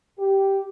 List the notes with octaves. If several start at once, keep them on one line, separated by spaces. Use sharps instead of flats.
G4